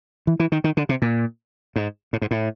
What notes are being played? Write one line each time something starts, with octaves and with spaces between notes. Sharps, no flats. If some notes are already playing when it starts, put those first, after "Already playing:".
E3
E3
D#3
D#3
D3
C3
A#2
G#2
A2
G#2
A2